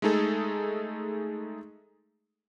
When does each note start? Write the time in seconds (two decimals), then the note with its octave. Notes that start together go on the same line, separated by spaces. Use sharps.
0.02 G#3 A3 D#4 G#4 A4